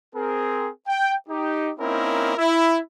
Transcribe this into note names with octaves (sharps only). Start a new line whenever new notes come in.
C4 G#4 A#4
G5
D#4 G4
A#3 C4 C#4 D#4 E4 A#4
E4